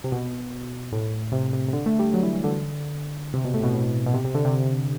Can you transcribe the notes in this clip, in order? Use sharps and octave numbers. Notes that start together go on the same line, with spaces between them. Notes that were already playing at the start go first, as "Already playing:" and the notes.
C3
B2
A2
C3
C3
C3
D3
A3
G3
F#3
E3
E3
D3
C3
B2
A2
B2
A2
B2
C3
C3
D3
C3